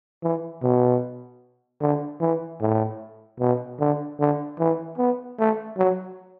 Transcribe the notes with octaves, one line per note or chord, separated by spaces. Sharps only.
E3
B2
D3
E3
A2
B2
D3
D3
E3
B3
A3
F#3